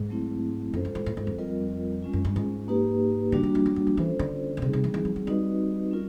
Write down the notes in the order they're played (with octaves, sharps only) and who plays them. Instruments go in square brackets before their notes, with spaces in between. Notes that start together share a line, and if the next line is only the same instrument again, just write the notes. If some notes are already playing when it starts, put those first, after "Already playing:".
Already playing: [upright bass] G#2
[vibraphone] F#3 A3 C4 E4
[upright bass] F#2 [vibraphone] F4 A4 C5
[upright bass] G#2
G#2
A2
G#2
F2
[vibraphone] G3 C4 F4 A#4 D#5
G#3 C#4 F4
[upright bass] F#2
G2
G#2
[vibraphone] A#3 D#4 G4 B4
[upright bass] D3 [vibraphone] G3 A#3 D4 F#4
[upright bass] D#3
E3
F#3
F#3
F3
[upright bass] E3 [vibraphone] C#4 F4 A4 C5
[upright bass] D3
B2
[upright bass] C3 [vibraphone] G3 C4 D#4 G#4
[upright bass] C3
E3
E3
F3
F#3
[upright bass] G3 [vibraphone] C4 D#4 F#4 B4 D#5
[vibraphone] C#4 F4 A#4